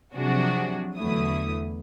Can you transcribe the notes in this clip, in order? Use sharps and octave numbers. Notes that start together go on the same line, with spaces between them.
C3 F3 F#3 D4 F#4 G#4
E2 D3 F#3 A3 E4 D#6